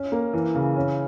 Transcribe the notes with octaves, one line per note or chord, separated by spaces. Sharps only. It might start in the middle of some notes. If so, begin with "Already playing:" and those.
Already playing: C#4
A#3
E3
C#3
C#4